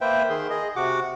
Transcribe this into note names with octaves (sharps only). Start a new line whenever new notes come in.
A#3 B4 C5 E5 G5
D#3 G#4 C6
G#4 D#5
C3 F#4 F#5 D6